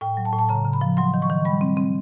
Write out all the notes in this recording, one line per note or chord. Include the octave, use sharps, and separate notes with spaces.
A2 G5
F#3
A5
A2
A5
C#3 A#5
C#3
B5
F3
F#3 C6
D#3
C#6
D#3
G3 B5
C4
C4